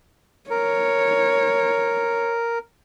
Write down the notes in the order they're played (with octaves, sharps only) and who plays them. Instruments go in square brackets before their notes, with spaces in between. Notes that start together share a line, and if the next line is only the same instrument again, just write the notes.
[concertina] A#4 [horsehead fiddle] C#5